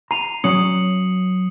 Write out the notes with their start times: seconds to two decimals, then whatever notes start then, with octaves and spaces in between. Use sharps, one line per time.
0.11 A#5 C7 D#7 F7
0.44 F#3 C#4 D#6 C#7 F#7